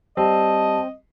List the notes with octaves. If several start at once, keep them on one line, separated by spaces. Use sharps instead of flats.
G3 C4 D#5 A5